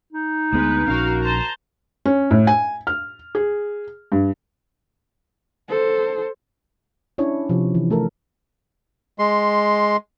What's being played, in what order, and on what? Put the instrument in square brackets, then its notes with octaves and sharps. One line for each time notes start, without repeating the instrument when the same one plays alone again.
[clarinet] D#4
[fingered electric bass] D2 B3 [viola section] G#3 B4
[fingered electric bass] A#1 C#4 [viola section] F#4 A#4 F5
[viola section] C5 A5 A#5
[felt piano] C#4
A2
G#5
F6
G#4
G2
[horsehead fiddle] A4 C5
[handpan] C#4 D4 E4 C#5
C3 F3
E3
A3 A4 A#4
[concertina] G#3 C6